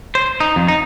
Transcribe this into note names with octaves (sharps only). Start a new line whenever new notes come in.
C5
D#4
F2
D#4